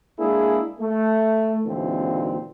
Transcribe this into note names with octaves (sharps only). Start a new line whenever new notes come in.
G#3 A#3 D4 E4 G#4
A3
G#1 D#2 A#2 D3 E3 C4